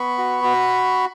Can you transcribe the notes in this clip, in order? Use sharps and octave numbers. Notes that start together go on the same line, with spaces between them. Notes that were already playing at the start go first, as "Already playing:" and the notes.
Already playing: B3 B5 C#6
F#4
F#4